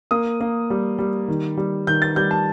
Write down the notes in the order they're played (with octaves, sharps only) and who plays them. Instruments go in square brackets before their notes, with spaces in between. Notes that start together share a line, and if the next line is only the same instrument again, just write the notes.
[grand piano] A#3 D#6
A#3
G3
G3
D#3
G3
D#3 G6
A6
G3 G6
A5